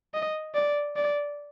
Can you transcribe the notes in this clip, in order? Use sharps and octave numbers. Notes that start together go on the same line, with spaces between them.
D#5
D5
D5